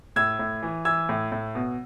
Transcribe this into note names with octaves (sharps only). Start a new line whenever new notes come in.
A2 E6 G#6
A2
E3
E3 E6 G#6
A2
A2
B2